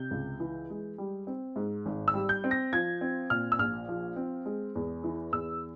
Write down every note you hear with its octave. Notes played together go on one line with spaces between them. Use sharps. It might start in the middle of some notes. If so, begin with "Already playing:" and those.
Already playing: C3 G6
C#2
E3
G#3
G3
C4
G#2
G#1
E6
G3
G6
C4
A#6
F3 G#6
C4
A#2 F6
E6
A#1 F6
F3
C4
G#3
E2
E3
E2 E6